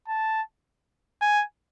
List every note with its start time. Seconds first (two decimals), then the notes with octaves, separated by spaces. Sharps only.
0.08 A5
1.21 G#5